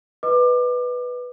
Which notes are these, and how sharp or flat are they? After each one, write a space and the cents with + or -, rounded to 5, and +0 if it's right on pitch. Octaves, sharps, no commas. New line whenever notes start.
B4 +0 D#5 +0 D6 +25